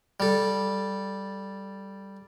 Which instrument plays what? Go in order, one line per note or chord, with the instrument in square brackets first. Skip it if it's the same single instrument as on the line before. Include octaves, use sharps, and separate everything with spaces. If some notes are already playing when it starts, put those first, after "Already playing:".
[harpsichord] G3 A4